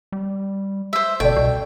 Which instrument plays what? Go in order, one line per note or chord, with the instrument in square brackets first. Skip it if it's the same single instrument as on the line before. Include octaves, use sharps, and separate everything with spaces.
[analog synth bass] G3
[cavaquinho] C5 E5
[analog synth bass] G1 [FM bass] B2 [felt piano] A4 D5 [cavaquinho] G5
[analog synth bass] C2 [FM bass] B2